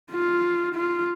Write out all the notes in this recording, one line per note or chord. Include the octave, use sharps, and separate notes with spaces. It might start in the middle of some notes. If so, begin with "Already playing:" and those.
F4
F4